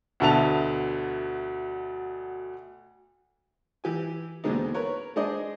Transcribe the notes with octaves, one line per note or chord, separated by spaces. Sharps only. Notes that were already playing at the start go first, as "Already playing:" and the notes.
D2 B2 D3 E5 A5 F7
E3 G4 G#5
D#2 B2 D3 G#3 C4 D#4
A#4 B4 C#5
G#3 D4 G#4 C5 D#5